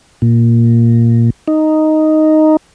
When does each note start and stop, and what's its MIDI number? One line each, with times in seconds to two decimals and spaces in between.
0.22 1.30 46
1.48 2.57 63